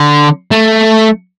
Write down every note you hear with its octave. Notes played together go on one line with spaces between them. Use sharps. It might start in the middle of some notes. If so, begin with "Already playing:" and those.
Already playing: D3
A3